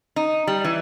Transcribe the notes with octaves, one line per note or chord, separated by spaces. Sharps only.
D#4
G3
E3